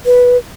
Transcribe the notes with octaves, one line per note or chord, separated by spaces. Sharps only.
B4